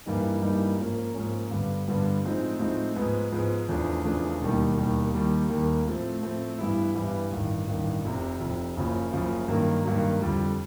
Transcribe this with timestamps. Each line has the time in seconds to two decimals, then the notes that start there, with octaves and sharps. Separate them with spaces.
0.06 G2 E3 G3 A#3 D#4
0.42 G2 E3 G3 A#3 D#4
0.78 G#2 F3 A#3 C#4
1.14 G#2 F3 A#3 C#4
1.51 G2 D3 G3 B3
1.87 G2 D3 G3 B3
2.24 A2 F3 G#3 C4 D#4
2.59 A2 F3 G#3 C4 D#4
2.96 G#2 F3 G#3 B3
3.32 G#2 F3 G#3 B3
3.68 E2 C#3 F3 A3 D4
4.05 E2 C#3 F3 A3 D4
4.41 E1 D#2 D#3 G3
4.77 E1 D#2 D#3 G3
5.14 D#2 D#3 G3 A#3
5.50 D#2 D#3 G3 A#3
5.85 A2 F3 A3 C4
6.22 A2 F3 A3 C4
6.58 G2 E3 G3 B3 E4
6.95 G2 E3 G3 B3 E4
7.31 A1 G2 D#3
7.68 A1 G2 D#3
8.04 F1 F2 C3
8.40 F1 F2 C3
8.77 F#1 F#2 C#3 F3
9.13 F#1 F#2 C#3 F3
9.48 G2 D#3 F#3 A#3
9.85 G2 D#3 F#3 A#3
10.21 F2 D3 G3